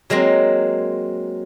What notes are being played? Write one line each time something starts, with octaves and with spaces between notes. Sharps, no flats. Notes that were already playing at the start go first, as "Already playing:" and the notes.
F#3 G#3 A#3 C4